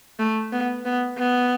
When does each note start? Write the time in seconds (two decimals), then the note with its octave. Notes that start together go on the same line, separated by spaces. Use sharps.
0.19 A3
0.52 B3
0.85 B3
1.18 B3